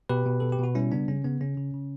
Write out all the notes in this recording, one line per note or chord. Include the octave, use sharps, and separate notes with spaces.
B2 G4 B4
B2
B2 A4
G4
B2 F#4
G3 C#4 E4
C#3 B3 D4
C#3 C#4
C#3 B3
C#3 C#4
C#3
C#3